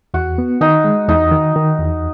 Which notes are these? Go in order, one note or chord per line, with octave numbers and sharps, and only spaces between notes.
E2 F#4
B3
D#3 D#4
G#3
E2 D#4
D#3
D#3
E2